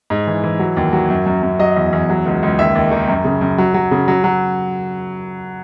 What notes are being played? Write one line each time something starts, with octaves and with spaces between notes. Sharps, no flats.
G#2
E3
E3
F#3
D#2
F#3
F#2
F#2
F#2
F#3 D#5
E2
E2
F#3
C#2
C#2
D#2 E5
D#2
D#3
F#2
C#3
F#2
F#3
F#3
C#3
F#3
F#3